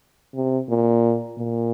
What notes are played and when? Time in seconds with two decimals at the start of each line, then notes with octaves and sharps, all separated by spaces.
0.35 C3
0.69 A#2
1.38 A#2